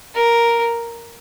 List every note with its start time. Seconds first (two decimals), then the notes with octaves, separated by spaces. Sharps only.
0.14 A#4